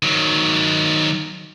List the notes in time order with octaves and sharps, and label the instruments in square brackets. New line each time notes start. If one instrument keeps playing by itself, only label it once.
[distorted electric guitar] D#3 F#3